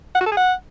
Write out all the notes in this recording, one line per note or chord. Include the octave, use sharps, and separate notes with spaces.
F#5
F#4
A4
G#4
F#5